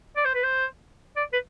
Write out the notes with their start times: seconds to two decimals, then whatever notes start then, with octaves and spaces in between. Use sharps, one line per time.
0.16 D5
0.25 C5
0.34 B4
0.44 C5
1.16 D5
1.33 B4